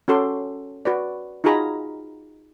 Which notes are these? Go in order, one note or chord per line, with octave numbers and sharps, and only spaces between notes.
C#4 F#4 A4 C6 D6
F#4 B4 D5
D#4 F4 F#4 G#4 A#5 B5